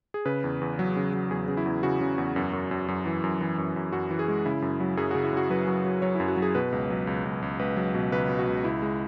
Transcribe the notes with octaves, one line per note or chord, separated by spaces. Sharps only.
G#4
C#3 B4
E2
E2
F#3
C#3
F#3
E2 G#4
C#3
E4
E2
C#3 F#4
C#3
E2
F#2
F#2
F#2
F#2
E3
F#2
E3
F#2
F#2
F#2 F#4
E3
G#4
G#3
C#3 E4
F#2
F#3
F#2 G#4
C#3 F#4
E4
C#3 F#4
F#3 B4
F#3
F#3
F#3 C#5
E4
F#2
F#4
F#3
G#4
B2 B4
C#2
F#3
C#2
C#2
C#2
C#2 B4
F#3
B2
C#2 B4
B2
F#4
C#2
C#2 E4
G#3